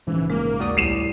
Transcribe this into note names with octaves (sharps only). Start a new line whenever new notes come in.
A#1 G#2 C#3 E3
G#3 A#3
D#2 F#4 D5 D#6
C2 A2 G3 C7 D#7 E7